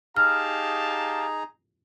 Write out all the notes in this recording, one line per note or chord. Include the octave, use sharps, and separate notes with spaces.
D#4 G4 G#4 F5 A5 A#5 F6